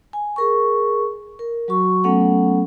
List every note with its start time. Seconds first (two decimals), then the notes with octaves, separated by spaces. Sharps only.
0.13 G#5
0.36 G#4 A#4 C#6
1.39 A#4
1.68 F#3 F#4 C#6
2.04 F#3 A3 B3 C#4 A4 F#5